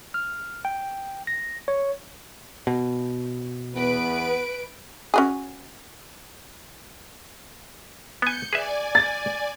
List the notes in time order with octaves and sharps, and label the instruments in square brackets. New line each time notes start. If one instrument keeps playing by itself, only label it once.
[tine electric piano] F6
G5
A#6
C#5
[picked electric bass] B2
[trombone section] E2 B3 [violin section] B4 D7
[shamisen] C#4 F#4 G#4
[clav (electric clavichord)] B3 G#5 [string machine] G6 C#7
[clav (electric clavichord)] G#4 B4 E5 [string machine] D5 G#5
[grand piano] A6